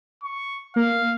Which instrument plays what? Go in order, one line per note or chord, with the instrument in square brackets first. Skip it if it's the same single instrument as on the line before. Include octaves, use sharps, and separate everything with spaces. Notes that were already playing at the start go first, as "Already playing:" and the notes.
[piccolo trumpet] C#6
[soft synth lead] A#3 [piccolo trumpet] F5